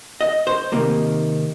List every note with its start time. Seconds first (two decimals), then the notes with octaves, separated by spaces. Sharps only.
0.21 D#5
0.47 C5
0.72 C3 D#3 A#3 D#4